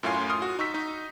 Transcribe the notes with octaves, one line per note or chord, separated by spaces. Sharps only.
F#2 A2 F4 F5 G#5 C6
C6 D#6 F6
F#4
D#4 C#6 E6 B6
D#4 D#5